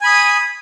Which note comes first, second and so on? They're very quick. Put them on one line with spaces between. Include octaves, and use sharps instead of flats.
G#5 B5 D#6